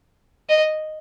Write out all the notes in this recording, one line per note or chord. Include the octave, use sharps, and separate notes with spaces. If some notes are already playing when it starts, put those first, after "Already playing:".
D#5